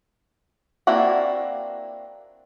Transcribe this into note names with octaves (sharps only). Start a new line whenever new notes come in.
A#3 C4 D4 E4 F#4